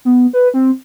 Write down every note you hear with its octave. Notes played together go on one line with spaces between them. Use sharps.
B3
B4
C4